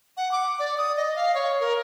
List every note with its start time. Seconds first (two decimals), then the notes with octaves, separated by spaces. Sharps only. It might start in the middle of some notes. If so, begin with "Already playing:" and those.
0.17 F#5
0.32 D6
0.59 D5
0.78 D#6
0.97 D#5
1.15 F5
1.35 C#5
1.60 A#4